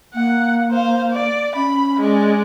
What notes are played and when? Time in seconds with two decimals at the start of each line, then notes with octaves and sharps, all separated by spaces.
0.14 A#3 F#5
0.71 C5 F5
1.12 D5
1.55 C#4 B5
2.00 G#3 D5